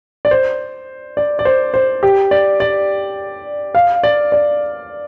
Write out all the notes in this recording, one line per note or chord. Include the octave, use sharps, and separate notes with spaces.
D5
C5
D5
D5
C5
C5
G4
D5
D5
F5
D5
D5